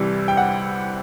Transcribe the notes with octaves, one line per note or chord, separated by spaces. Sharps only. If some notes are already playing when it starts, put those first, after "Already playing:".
Already playing: C2 C3 E3 G3
G5
F#5